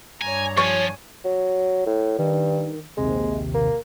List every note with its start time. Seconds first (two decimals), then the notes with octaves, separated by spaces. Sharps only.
0.21 G2 C#5 G#5 A#5
0.57 F3 C#5 G#5
1.24 F#3
1.86 A2
2.18 G2 D#3
2.97 A#1 D#2 C3 G#3
3.54 A#3